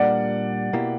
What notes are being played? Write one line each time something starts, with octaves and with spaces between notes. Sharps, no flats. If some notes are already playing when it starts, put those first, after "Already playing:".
Already playing: A#2 G3 A#3 D4 D5 F#5
B2 A#3 E4 G4